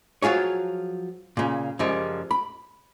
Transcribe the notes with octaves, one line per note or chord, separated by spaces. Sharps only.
F3 F#3 F4 G#4 C#5
A#2 C#3
F#2 C#3 F3 G3 G#3
B5